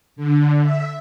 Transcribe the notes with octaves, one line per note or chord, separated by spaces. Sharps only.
D3
E5